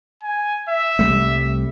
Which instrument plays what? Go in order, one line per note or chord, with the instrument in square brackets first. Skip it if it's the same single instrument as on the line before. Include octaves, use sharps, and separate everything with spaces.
[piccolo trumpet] G#5
E5
[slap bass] C2 G3 A3